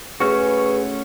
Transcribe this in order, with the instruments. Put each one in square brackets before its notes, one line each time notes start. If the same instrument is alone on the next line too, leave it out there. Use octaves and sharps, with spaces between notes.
[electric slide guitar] A3 C#4 F#4 [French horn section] G#4 B4